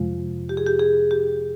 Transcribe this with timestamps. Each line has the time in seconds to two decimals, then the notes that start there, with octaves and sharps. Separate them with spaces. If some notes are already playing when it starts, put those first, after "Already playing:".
Already playing: F2 C3 F3 G#3 F4
0.49 G4
0.57 G#4
0.66 G4
0.80 G#4
1.11 G4